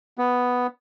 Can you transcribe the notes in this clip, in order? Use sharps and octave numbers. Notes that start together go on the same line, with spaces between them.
B3